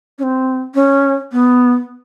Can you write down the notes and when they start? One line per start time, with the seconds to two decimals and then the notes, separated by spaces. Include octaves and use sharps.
0.19 C#4
0.23 C4
0.75 C#4
1.32 B3